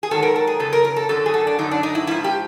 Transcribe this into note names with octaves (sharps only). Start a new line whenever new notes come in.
G#4
G#2 D#3 F#3 A4
A#4
A4
G#4
F#2 C#3 A4
A#4
A#4
A4
F#2 D3 F#3 A4
G#4
A4
D4
F#2 D3 F#3 D#4
D4
D#4
E4
G#2 F3 E4
G4